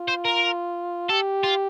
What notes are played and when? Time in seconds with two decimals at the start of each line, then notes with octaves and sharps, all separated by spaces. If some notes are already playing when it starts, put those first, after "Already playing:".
Already playing: F4
0.08 C5
0.25 A#4
1.09 G4 A4
1.43 F4